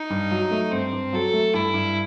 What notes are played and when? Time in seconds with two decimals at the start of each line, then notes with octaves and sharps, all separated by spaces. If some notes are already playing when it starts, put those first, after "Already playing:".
Already playing: D#4
0.10 G2
0.31 F#3
0.51 A3
0.71 G2 C4
0.92 G2
1.13 F#3 A4
1.33 A3
1.54 G2 E4
1.74 G2